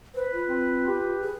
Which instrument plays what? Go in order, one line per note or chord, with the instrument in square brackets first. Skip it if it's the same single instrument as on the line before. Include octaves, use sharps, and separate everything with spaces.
[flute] B4 [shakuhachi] C5
[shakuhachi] F4
[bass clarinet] C4
G4
[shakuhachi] G#4